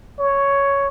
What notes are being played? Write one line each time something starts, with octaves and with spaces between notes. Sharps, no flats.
C#5